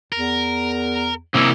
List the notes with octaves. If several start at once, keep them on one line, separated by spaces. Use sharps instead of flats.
E2 A#4
C3 G3 A#3 C#4 E4